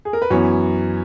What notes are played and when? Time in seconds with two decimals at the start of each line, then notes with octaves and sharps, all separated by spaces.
0.05 G#4
0.13 A#4
0.22 B4
0.30 F#2 E3 B3 C#5